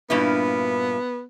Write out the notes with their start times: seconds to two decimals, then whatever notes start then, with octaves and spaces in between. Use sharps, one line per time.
0.10 G2 A#2 B3 E4